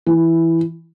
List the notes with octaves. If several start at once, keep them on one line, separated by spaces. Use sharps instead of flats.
E3